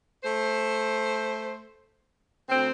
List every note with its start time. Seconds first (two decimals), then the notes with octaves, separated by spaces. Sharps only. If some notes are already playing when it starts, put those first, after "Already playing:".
0.24 A3 C5
2.49 D2 C4